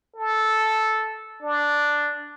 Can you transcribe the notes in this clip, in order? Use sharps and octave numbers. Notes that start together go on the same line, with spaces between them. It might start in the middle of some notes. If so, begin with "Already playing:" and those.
A4
D4